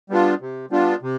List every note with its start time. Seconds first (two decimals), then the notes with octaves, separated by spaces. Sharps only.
0.10 G3 B3 D4 F4
0.41 C3
0.71 G3 B3 D4 F4
1.02 C3